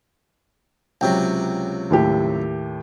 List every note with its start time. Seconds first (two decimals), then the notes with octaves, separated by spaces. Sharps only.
1.01 C#2 C3 F#3 G5
1.90 D#2 A2 G4